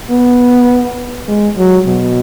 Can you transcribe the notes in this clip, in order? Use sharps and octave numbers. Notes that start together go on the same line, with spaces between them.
B3
G#3
F#3
B2